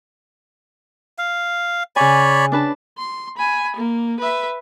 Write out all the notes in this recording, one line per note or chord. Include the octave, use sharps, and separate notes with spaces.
F5
C#3 C#5 D5 G#5 B5
D4 B4 A5
C6
G#5 B5
A#3
B4 E5